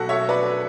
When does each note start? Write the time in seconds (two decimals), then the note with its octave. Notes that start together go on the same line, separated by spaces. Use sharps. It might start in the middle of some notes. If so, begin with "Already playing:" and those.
Already playing: B1 B2 F#3 F#4 A4
0.09 C#5 E5
0.29 B4 D5